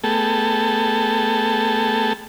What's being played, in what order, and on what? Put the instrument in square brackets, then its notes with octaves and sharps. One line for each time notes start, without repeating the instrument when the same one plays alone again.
[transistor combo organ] A3 B3 G#4 A4 G5 A5